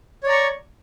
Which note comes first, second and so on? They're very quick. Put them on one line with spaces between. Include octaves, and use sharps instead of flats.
C#5 D5 A#5 C#6